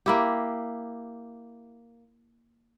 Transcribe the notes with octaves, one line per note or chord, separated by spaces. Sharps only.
A#3 E4 G4